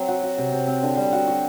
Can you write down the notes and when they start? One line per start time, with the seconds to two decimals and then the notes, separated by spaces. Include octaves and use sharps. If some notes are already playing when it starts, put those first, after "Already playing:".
Already playing: F#3 C4
0.08 F#4
0.23 F#4
0.38 C3
0.53 C3
0.67 C4
0.83 D3
0.97 G3
1.12 F#4
1.28 F#4